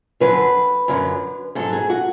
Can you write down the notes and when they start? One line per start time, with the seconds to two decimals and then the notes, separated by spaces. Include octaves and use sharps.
0.20 F#2 D3 F#3 B4
0.88 F#2 D3 F#3
1.55 G#2 F#3 A4
1.73 G#4
1.90 F#4